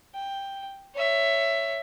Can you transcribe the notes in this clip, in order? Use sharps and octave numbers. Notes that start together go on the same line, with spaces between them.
G5
C#5 E5